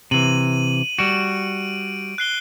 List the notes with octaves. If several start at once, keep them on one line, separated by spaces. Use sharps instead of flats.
C3 E3 D#7 F#7
G3 F#4 D7
F#6 C7 G7